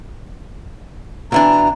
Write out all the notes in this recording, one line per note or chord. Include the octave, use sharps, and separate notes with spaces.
B2 E3 D4 A#5